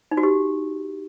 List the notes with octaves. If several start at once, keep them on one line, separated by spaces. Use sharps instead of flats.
D#4
F#4
G4